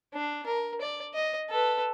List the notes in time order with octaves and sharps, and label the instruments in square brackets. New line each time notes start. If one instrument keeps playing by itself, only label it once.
[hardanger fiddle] D4
A#4
D5
D#5
A4 B4